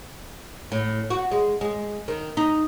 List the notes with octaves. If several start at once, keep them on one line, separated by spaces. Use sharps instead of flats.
A2
F#4
G#3
G#3
D#3
D#4